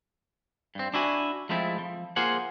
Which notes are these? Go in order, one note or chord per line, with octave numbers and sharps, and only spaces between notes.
G2 C4
D4 E4 F#4 G#5
F3 G#3 A3 C4 E4
F3
A#3 F4 G#4 C5 F#5